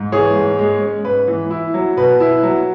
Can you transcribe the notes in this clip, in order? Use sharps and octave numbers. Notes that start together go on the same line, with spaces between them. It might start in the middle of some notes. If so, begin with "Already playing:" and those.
Already playing: G#2
E3 G#4 C#5
G#2
G#3
C#4
G#2 B4
E3
E4
F#3
B2 B4
E4
F#3